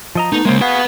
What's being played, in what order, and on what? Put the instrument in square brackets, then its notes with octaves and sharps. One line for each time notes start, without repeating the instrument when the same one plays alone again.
[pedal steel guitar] F3 D#5 A#5
[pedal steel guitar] A3 B3 [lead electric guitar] D#4
[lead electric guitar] C#3 G#3 [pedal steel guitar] A#3 C5
[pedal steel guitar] F#4 G#4 F5 [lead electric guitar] B4 F#5